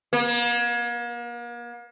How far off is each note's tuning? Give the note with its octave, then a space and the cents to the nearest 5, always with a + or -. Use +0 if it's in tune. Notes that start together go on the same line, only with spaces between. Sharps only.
A#3 +40